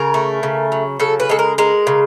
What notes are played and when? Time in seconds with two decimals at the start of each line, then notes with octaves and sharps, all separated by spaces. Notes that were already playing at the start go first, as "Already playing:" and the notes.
Already playing: C#3 A#4
0.14 A3
0.43 C#3
0.72 F#3
1.00 C#3 A4
1.20 B4
1.29 G#3 A4
1.39 A#4
1.58 G#3 A#4
1.87 C#3